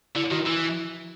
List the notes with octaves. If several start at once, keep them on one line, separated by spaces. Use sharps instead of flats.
D3 E4
D#3 F#4
E3 E4